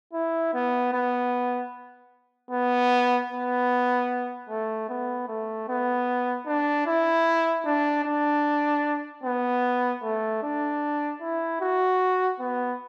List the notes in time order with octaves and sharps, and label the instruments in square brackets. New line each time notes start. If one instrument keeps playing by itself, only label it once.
[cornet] E4
B3
B3
B3
B3
A3
B3
A3
B3
D4
E4
D4
D4
B3
A3
D4
E4
F#4
B3